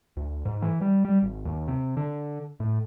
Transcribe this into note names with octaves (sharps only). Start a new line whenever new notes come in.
D2
G#2
E3
G3
G3
G#1
D#2
C3
D3
A2